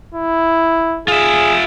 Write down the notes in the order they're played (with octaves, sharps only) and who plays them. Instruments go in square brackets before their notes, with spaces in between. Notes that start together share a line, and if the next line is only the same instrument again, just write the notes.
[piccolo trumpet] E4
[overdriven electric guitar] F4 E5 [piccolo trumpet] G#4